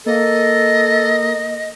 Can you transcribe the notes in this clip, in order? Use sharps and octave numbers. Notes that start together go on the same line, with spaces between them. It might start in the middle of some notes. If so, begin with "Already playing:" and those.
A#3 A4 D#5